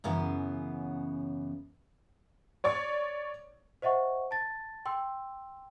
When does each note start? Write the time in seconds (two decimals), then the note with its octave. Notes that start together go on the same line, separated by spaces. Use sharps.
0.04 F#2 C#3 E3 B3
2.64 C#5 D5 C#6
3.82 C5 D#5 E5 F#5 C#6
4.31 A5 A6
4.86 G5 C6 E6